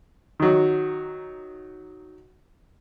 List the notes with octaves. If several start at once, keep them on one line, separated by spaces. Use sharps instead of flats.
D#3 F#3